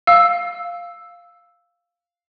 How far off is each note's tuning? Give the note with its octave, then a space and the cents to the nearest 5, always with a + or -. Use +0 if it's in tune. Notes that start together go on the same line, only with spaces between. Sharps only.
F5 +0 E6 +0